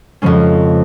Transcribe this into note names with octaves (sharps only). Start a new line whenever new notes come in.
F2 C#3 F3 G#3 C#4